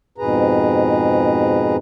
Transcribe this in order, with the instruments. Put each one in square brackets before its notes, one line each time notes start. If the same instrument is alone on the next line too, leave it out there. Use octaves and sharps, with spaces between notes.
[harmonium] F2 G#2 B2 G#4 B4 A#5